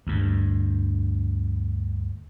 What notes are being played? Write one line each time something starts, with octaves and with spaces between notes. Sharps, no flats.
D2 G2